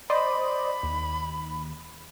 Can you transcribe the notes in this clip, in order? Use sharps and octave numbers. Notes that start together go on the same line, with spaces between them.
C5 D5 D#5 B5
D#2